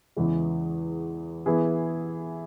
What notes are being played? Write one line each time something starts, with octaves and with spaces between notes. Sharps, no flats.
E2 C#3 E3 G#3
E3 B3 E4 G#4